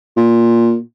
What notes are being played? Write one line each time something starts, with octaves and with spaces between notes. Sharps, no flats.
A#2